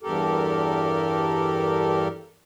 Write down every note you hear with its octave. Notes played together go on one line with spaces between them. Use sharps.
E2 G2 G4 A4 A#4